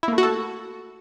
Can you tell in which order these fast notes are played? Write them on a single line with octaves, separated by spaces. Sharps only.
E4 A#3 A3 F#4 A4